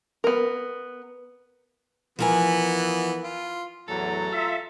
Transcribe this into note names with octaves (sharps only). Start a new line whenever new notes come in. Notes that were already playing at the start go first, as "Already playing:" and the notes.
B3 A#4
E3 F3 B3 A#4 G#5
F4
E2 A2 F#3 A4 A#5
F4 E5